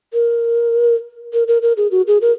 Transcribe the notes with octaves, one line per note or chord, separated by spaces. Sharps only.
A#4
A#4
A#4
A#4
G#4
F#4
G#4
A#4